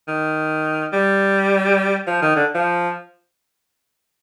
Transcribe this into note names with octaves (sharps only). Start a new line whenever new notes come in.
D#3
G3
F3
D#3
D3
F3